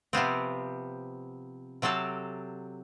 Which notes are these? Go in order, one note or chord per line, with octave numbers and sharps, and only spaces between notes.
C3 F3 B3 C4
C3 F#3 C4 A4 A5